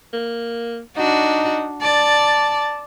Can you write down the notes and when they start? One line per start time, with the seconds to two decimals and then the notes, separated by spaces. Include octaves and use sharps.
0.13 A#3
0.97 D4 D#4 F#4
1.82 D5 A5